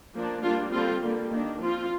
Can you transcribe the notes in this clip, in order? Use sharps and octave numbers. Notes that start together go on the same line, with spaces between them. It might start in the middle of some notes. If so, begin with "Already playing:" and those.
F3 A#3 D4
G3 A#3 D4 F4
D3 G3 C4 F4
D3 G3 A#3
D#3 A#3 D4
F3 C4 F4